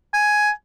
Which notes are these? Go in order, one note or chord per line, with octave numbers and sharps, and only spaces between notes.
G#5